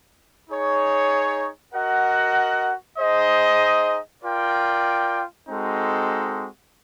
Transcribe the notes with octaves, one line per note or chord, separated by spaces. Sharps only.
D#4 G#4 C#5
F#4 A#4 D#5 F#5
D#4 G#4 C5 D#5
F4 A#4 D5 G5
G#3 C4 D#4 F#4 A4